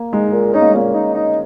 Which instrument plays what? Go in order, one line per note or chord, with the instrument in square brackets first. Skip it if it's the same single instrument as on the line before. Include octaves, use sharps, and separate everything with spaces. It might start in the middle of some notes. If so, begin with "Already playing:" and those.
Already playing: [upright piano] A#3
[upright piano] G#3 [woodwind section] D#4
[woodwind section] A#2
[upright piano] C#4 [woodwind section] D#4
[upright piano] A#3
G#3
[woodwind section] A#2 [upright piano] A#3
[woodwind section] D#4
D#4